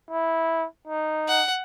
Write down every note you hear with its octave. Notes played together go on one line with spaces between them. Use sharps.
E4
D#4
F#5